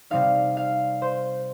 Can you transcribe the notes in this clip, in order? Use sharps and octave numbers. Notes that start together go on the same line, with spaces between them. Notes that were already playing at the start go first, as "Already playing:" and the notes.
C3 G3 C4 D#4 F5
F5
C5